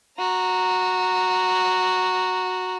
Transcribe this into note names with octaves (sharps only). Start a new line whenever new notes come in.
F#4 A#5